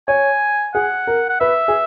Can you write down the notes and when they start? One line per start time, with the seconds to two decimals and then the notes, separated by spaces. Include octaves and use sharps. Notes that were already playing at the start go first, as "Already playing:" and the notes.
0.08 C#5 G#5
0.74 G#4 F#5
1.07 A#4
1.29 F#5
1.40 B4 E5
1.68 G#4